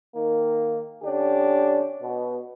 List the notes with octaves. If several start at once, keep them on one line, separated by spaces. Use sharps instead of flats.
D#3 A#3
D3 C#4 D4 G4
B2